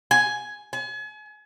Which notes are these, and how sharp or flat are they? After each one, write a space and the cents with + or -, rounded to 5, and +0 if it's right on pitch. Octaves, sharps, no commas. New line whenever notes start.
G#5 +10
G#5 +40